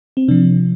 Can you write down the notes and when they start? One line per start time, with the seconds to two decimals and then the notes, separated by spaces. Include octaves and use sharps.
0.17 C4
0.28 C3 F3 D4